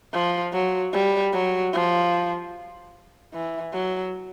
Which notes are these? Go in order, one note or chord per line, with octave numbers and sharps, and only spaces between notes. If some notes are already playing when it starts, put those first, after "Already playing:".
F3
F#3
G3
F#3
F3
E3
F#3